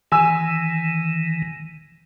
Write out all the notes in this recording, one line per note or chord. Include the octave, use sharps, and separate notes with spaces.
D#3 E3 G#5 E6